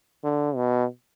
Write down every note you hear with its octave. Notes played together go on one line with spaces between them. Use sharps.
D3
B2